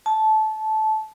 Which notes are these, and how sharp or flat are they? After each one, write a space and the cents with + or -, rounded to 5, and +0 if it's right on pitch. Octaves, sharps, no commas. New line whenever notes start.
A5 -20